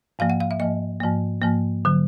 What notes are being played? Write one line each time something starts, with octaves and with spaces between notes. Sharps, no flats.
G#2 F3 A#3 F5
F#5
F5
E5
G#2 F3 A#3 D#5
G#2 F3 A#3
G#2 F3 A#3
D3 F#3